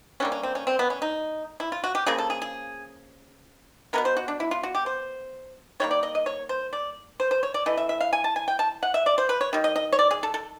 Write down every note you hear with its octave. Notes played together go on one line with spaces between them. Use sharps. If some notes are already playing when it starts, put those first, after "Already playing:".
D3 G3 A#3 C#4
C#4
C4
C#4
C4
B3
C#4
D#4
E4
F4
F#4
G4
C#3 F3 A#3 G#4
A4
G#4
G#4
B2 G#3 B3 A#4
C5
F#4
D4
E4
F4
F#4
G4
C5
D#3 G3 A#3 C#5
D5
D#5
D#5
C#5
C5
D5
C5
C5
C#5
D5
E3 A3 D#5
E5
E5
F5
G#5
A5
G#5
G5
A5
F#5
E5
D5
C5
B4
C#5
D#3 G3
D#5
D#5
C#5
D5
G#4
A4
A4